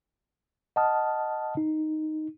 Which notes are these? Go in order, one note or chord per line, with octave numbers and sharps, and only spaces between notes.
D#5 F#5 A5 D#6 F6
D#4